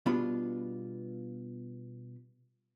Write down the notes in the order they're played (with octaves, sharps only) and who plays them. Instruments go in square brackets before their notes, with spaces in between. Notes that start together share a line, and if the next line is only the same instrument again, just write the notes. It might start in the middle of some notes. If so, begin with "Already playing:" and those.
[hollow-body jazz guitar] B2 G3 B3 D4 F4 B5